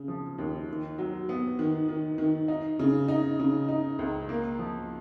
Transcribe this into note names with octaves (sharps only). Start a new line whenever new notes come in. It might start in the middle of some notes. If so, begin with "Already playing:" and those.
Already playing: C#3
F3
D#2
D#3
F#3
B3
D#3
D#3
D#3
D#4
C#3
D#4
C#3
D#4
C#2
A#3
F3